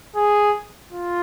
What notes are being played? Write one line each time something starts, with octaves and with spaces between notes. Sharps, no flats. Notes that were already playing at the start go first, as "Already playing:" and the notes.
G#4
F4